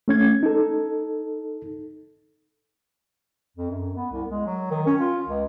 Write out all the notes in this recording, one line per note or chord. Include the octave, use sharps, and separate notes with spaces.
A3 C#4 G#6
D#4 A4
F2
F#2
B3
C2
G#3
F#3
D#3
C#4
F4
C#2